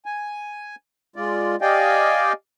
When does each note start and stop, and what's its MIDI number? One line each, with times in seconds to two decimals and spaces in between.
0.06 0.75 80
1.16 1.56 56
1.16 1.56 65
1.16 1.56 74
1.61 2.33 67
1.61 2.33 74
1.61 2.33 75
1.61 2.33 77
1.61 2.33 79
1.61 2.33 80